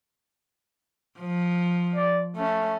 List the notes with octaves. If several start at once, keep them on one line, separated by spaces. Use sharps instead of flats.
F3
D5
A3 C#4